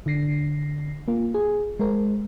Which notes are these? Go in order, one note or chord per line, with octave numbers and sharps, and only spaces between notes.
D3 D4 A#6 C7
A#3 F4
G#4
G#3 G#4 A#4 C5